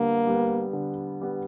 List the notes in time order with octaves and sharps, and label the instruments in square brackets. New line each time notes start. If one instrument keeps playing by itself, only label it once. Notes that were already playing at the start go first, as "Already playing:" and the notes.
Already playing: [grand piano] D3 G3 B3 [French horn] A#3
[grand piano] G3 B3
D3
G3 B3